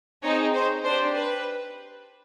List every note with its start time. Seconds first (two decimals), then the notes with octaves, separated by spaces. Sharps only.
0.23 C4 D#4 G#4 C#5
0.54 C5
0.84 D4 G4 C5
1.14 B4